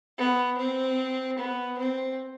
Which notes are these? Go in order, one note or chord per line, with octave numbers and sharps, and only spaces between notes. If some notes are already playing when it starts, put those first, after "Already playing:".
B3
C4
B3
C4